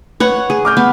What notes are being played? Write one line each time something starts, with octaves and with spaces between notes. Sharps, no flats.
B4 C#5 F#5
G#4
D6 F6 G6
B3